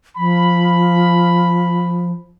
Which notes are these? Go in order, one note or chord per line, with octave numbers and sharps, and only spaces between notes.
F3 B5